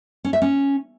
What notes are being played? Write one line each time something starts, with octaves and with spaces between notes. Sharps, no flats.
C#4
E5
C#4